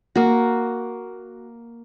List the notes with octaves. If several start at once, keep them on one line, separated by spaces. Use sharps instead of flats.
A#3 F#4